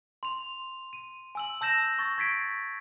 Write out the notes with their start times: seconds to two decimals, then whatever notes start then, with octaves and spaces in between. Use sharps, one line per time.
0.23 C6 F7
0.93 D#7
1.35 G#5 E6 F#7
1.61 A5 E6 G6 A#6 E7
1.99 C#6 A6
2.18 C#6 G#6 A6 B6 C7 D7